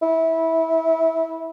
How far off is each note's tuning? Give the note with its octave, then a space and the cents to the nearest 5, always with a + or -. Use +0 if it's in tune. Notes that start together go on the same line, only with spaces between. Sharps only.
E4 -20